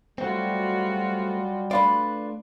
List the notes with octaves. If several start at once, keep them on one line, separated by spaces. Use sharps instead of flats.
F#3 G3 A3 C4 F4 F#4
A3 D4 F4 B4 D5 B5